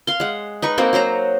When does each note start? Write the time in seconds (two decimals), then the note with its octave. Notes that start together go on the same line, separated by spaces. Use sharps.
0.07 F5 C6
0.20 G#3 F#5
0.62 D#4 B4 C#6
0.78 A#3 C4 F#4
0.93 F#3 F#4 C5 A#5